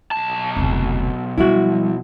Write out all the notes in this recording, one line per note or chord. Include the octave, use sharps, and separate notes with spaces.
B1 A5
F1 D2
F3 G3 E4 F#4